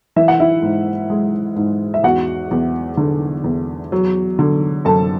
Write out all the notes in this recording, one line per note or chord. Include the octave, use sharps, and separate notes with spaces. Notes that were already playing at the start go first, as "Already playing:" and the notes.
E3 E5
F#5
E4 E5
G#2
G#3
G#2
E5
E2 F#4 F#5
E2
D3
E2
F#3
D3
F#2 A4 A5